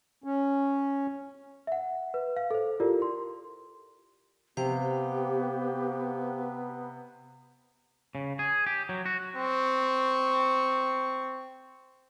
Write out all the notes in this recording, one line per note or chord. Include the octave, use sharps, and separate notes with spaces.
C#4
E5 F#5
B4
F5
A4 C5
E4 F4 G4 A4 A#4 D5
C6
C3 B3 G4 C5 F5 G5
C#3
G#4
G4
F#3
F#4
C4 C#6